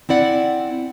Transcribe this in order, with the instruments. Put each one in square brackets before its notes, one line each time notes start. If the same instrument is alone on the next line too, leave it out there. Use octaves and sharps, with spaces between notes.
[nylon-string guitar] C4 E4 D5 F#5